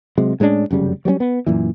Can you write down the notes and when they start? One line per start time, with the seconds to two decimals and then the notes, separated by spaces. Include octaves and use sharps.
0.18 C3 F#3 G#3
0.40 A2 G#3 C#4 D4
0.71 F1 F#2 C#3 G3
1.05 F#3 G3 B3 C#4
1.20 B3
1.46 F#2 A#2 E3